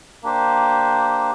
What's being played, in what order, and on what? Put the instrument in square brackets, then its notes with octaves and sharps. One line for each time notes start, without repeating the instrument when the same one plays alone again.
[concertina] A#3 D4 G4 C5